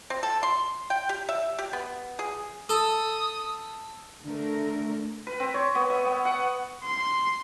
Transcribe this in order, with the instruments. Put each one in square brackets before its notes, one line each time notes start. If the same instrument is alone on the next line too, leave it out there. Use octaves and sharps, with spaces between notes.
[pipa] C4
A4
C6
G5
G4
E5
G4
B3
G#4
[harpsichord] A4 [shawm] D#6
[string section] D3 A3 A#4
[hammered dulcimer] B4
C4
C#5
B3
E5
B3
F#5
[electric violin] C6